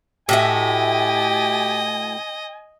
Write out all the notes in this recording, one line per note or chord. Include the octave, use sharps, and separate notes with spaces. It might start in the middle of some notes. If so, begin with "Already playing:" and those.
A2 F#4 G4 D#5 E5 G#5